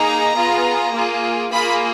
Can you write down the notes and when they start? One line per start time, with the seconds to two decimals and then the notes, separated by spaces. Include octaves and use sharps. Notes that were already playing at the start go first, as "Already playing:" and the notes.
Already playing: A#3 D#4 G#4 A#5
0.35 B3 F4 G#4
0.92 A#3 F4 G#4
1.50 A#3 F4 G#4 B5